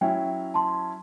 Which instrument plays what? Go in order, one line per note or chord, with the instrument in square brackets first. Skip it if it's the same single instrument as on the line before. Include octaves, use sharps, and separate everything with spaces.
[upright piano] F#3 C#4 E4 [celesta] G5
[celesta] A5 C6